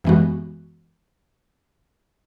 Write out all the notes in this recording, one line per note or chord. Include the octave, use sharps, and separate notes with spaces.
F#2 E3 G#3 B3 F#4